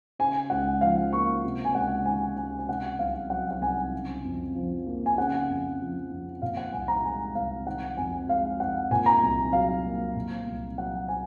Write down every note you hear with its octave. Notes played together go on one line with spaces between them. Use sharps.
C#3 G#5
C#2 F#5
F3 F5
A#3 C#6
C3
G#5
C#2 F#5
D#3 G#5
C#2 G#5
G#5
C3 F#5
C2 F5
F#3 F#5
F#5
C2 G#5
C#3
F2
F3
A#3
G#5
C#3 F#5
F2
F3
F2
A#2 F5
F#5
C2 G#5
A#5
G#3 G#5
C2 F5
D#3 F#5
F2 G#5
G#3 F5
F2 F#5
A#2 G#5
A#5
C2
F#3 F5
A#3
A#2
C2
F#3 F#5
G#5